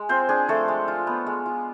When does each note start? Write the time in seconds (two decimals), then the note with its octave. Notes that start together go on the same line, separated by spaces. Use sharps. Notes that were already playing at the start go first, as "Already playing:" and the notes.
Already playing: G#3
0.09 C4 F4 C5
0.29 D4 G#4
0.48 F3 A3 A4
0.68 G#3
0.88 F4
1.07 B3
1.26 G#3
1.46 F4